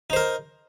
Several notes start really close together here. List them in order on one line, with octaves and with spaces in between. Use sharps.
D#4 C5 A#4